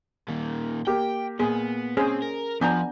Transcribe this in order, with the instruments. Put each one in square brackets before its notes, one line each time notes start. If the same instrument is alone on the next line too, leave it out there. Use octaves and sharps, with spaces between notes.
[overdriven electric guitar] A#2 D#3
[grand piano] A#3 G4 [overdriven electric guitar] G5
[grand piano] A#2 [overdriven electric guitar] B3 [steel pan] G#4
[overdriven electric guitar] C4 [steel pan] C#4 G#4 C5
[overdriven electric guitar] A#4
[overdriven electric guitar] F3 [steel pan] B3 D4 A#5 [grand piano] G#5 G6